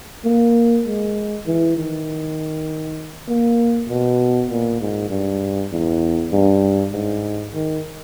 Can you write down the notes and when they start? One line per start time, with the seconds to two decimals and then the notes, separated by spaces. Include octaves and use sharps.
0.25 A#3
0.85 G#3
1.46 E3
1.77 D#3
3.29 A#3
3.89 B2
4.50 A#2
4.81 G#2
5.10 G2
5.72 E2
6.32 G2
6.92 G#2
7.53 D#3